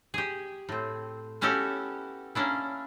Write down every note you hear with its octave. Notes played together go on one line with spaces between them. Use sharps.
G4 G#4
A2 C4
B3 C#4 E4 F#4 G4 A4
A#3 C#4 D4 E4